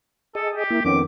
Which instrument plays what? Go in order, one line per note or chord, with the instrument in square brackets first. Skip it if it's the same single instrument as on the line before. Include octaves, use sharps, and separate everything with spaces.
[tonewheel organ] G#4 D#5 [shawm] A4
[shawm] G4
[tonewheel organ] A#3 E4
[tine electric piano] F2 D#3 B3 [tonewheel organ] C#4 [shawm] D6